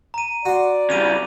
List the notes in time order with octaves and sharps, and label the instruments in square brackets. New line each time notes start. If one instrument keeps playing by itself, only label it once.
[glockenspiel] A#5 D#7
[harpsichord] F#4 C6 [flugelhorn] D5
[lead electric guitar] C#3 G3 [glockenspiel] D6 D#7 F7